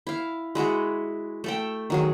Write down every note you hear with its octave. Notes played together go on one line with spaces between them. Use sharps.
E4 F5
G#3 E4 F#4 G#4
A3 A4 G5
D#3 F#3 G#4